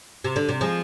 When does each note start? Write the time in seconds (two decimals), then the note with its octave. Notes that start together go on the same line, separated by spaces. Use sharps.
0.24 C3
0.36 D3
0.49 C3
0.61 F3 G#3